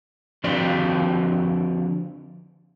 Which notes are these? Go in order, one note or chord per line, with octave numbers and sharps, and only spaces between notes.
D3 F3 C4 F#4 D5